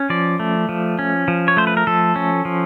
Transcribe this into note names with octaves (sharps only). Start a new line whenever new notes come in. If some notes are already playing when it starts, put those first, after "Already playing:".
Already playing: C#4
F3 D5
A3
F3
C#4
F3
C#5
A3 C5
B4
A#4
F3 A4
C#4
F3